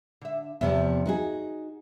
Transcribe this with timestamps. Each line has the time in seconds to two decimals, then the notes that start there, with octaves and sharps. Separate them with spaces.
0.21 D3 E5
0.61 E2 C3 F3 E5
1.06 D#4 F#4 G#4